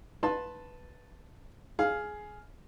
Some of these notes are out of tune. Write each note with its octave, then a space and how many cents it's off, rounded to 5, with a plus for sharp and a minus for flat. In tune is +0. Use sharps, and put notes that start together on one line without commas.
B4 +0 A5 +0 C6 +25
G#4 +10 F5 +0